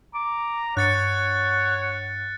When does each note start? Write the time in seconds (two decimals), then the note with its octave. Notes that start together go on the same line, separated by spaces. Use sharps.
0.15 A#5 D6
0.77 G2 C#5 F#5 F#6 A6 C#7